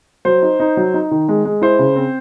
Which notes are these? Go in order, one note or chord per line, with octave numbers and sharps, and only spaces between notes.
F#3 C5
D#4
D#4
F#3
D#4
D#3
G#3
G#3
E4 C5
C#3
C4